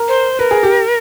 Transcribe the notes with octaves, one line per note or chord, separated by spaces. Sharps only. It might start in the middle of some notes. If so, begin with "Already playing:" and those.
Already playing: A#4
C5
A#4 B4
G#4
G4